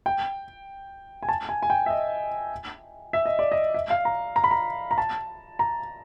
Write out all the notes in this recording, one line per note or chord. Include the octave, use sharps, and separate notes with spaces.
G5
G#5
A5
G#5
G#5
G5
E5
D#5
E5
D#5
D5
D#5
E5
F5
A#5
A#5
B5
A#5
A#5
A5
A#5